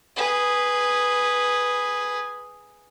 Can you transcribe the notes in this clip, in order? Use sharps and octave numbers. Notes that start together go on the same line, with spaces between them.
G#4 B4